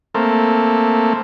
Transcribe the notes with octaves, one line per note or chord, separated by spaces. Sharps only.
A3 A#3 C4